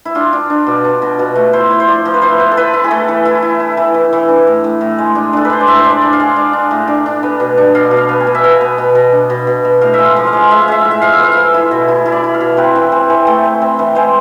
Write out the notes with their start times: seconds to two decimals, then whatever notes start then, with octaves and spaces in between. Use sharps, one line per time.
0.05 E4
0.15 D4 F4
0.33 D4
0.50 D4
0.67 B2
0.84 D4
1.02 B2
1.19 B2
1.35 A3
1.53 E4 C5
1.70 E4
1.80 C5
1.87 F3 D5
2.05 F3
2.14 B4
2.22 E4 C5
2.39 B3
2.51 A4
2.57 E4 B4
2.73 E4
2.84 G#4
2.91 A3 A4
3.08 E3
3.25 E4
3.42 E4
3.60 E4
3.77 E3
3.94 E3
4.13 E3
4.29 D4
4.47 A2
4.64 A2
4.81 A2
4.98 G#3
5.15 D4
5.33 D4 A4
5.45 B4
5.50 G#3 C5
5.60 D5
5.67 A2 E5
5.79 C5
5.84 D4
5.91 D5
6.02 D4
6.13 F5
6.20 G#3
6.36 D4
6.53 D4
6.71 A2
6.88 D4
7.06 D4
7.23 B3
7.40 B2
7.57 D4
7.75 B2 F5
7.91 B2
7.97 F5
8.09 B3
8.20 G#5
8.27 B2
8.35 E5
8.43 B2 F5
8.61 B3
8.78 B2
8.95 B2
9.12 D4
9.30 B2
9.47 B2
9.65 B2
9.81 A2 F5
9.94 G#3 E5
10.05 F5
10.16 F3
10.27 F5
10.33 G#3
10.51 G#3 E5
10.61 F5
10.68 G#3 E5
10.81 A2 F5
10.91 E5
11.01 F3 F5
11.12 E5
11.19 B3 F5
11.32 E4 E5
11.54 E4
11.71 B2
11.88 E4
12.06 E4
12.12 D5
12.24 E4
12.34 F5
12.41 B2
12.57 C4 B4
12.76 E3
12.92 C4
13.10 E3
13.27 A3
13.44 C4
13.62 C4
13.79 E3
13.95 G#3 C5